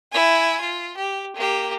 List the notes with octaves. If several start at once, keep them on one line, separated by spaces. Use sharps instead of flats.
E4 G#5
F4
G4
A#3 G4